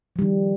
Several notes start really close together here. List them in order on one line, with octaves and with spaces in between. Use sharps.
F3 G3 D#3